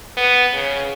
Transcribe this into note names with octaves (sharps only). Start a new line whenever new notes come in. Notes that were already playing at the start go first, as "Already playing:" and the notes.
B3
C#3